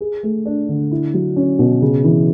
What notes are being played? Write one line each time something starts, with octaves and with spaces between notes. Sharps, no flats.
G#4
A3
D4
D3
E4
F#3
C#4
B2
C#3
E3